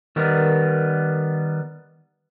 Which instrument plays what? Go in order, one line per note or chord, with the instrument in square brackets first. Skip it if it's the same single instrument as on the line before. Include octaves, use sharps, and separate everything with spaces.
[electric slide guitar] D#3 G3 B3 A#4